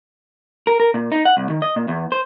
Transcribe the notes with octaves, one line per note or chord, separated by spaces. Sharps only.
A#4
A#4
A#2
D#4
F#5
C2
D#3
D#5
A#2
E2
C5